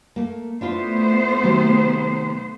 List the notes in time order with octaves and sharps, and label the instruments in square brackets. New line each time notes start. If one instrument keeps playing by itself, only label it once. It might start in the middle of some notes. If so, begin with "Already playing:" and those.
[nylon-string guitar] A3 A#3
[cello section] A3 B3 C5 [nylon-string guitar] D4 E4 F4
[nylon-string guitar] C3 D#3 F#3